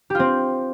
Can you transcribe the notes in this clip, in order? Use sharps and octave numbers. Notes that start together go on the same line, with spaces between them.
C4 F4 G4